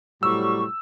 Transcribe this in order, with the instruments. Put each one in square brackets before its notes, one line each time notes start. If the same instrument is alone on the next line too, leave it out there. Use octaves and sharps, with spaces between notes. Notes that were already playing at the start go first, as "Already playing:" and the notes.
[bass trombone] A2 [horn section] C3 F#3 G3 [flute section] C#6 [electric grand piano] E6